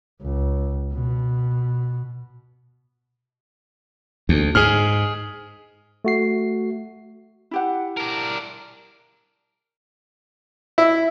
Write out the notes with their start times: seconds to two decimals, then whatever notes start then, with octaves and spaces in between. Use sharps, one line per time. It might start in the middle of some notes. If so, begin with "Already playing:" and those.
0.22 C#2
0.93 B2
4.29 D2
4.55 G#2 G#4 F6
6.05 A3 F#4 C7
7.51 E4 G4 F#5
7.97 D4 A#4
10.78 E4